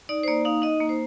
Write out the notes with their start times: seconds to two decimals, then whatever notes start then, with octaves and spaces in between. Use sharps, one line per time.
0.09 D#4 D5
0.23 C5
0.28 A#3 D5
0.45 D#4 F5
0.62 D#4 D#5
0.81 A#3
0.89 C5